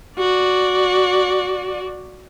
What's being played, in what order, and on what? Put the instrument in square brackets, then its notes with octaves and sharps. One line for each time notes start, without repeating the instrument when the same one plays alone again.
[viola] F#4 D5